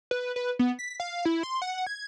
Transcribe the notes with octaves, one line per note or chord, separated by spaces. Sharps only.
B4
B4
B3
B6
F5
E4
C6
F#5
G#6